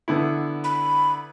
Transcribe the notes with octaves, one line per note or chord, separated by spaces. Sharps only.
D3 B3 E4
B5